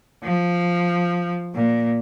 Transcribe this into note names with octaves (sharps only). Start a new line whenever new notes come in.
F3
A#2